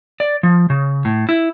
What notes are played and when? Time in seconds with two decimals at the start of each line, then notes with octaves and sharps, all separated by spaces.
0.20 D5
0.43 F3
0.70 C#3
1.05 A2
1.29 E4